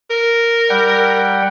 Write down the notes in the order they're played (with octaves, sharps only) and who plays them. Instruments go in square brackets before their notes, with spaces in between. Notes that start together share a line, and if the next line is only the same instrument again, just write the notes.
[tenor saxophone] A#4
[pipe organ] G3 F#5 G5